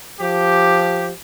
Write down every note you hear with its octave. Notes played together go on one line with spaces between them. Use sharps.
F3 G4